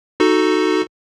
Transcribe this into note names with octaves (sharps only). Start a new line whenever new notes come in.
D#4 F#4 A4